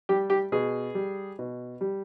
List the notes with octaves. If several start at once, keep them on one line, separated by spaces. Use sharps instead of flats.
G3 G4
G4
B2 G#4
G3
B2
G3